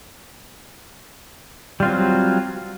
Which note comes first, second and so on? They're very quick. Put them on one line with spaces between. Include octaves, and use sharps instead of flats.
G3 F4 C4 F#3